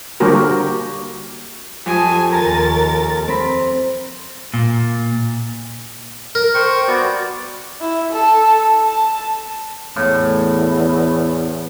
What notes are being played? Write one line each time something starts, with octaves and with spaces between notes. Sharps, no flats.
D3 G3 A#3 F#4 G4 A#4
F2 G4 D#5 G#5 A5
D#2 A#4 A#5 A6
C4 B5
A#2
A#4
C5 G5 C#6
B3 F#4 D5
E4
A4
A5
E2 A2